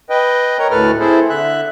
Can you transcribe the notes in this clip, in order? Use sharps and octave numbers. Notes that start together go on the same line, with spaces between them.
B4 D#5 G5
A#4 C#5 A#5
D2 A2 A4 B4 F6
C4 E4 G#4 A4 C5
D3 E5 F#6